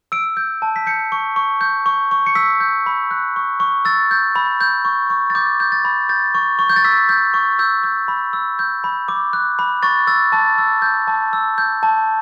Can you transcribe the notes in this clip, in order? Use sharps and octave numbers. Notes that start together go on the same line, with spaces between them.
E6 D7
G6
A5
B6
G6 C#7
C#6
C#6
G6
C#6
C#6
C#7
E6 B6
G6
B5
F#6
C#6
C#6
E6 A6
G6
B5
G6
C#6
C#6
A6
D6 G6
G6
A6
B5
G6 A6
C#6
C#6
G6
A6
E6 B6
G6
C#6
E6 G6
G6
B5
E6
G6
B5
D6
F#6
B5
C#6 A6
E6 A6
A5 A6
E6
G6
A5
E6
G6
A5